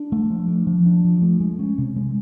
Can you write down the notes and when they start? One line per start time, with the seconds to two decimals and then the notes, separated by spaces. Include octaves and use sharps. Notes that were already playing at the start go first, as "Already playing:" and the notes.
Already playing: D4
0.12 A3
0.30 F3
0.48 D4
0.67 F3
0.86 D4
1.05 F3
1.22 A3
1.40 G#3
1.59 C#4
1.78 C3
1.96 G#3